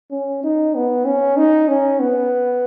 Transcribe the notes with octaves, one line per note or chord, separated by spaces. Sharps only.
C#4
D#4
B3
C#4
D#4
C#4
B3